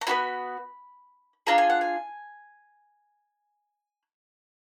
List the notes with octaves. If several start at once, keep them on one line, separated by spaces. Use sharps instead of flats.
A#5
B3 D4 F#4 B5
D4 F4 G#4 A#5
G#5
F#5
G#5